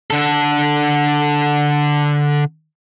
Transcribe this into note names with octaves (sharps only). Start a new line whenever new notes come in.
D3 A4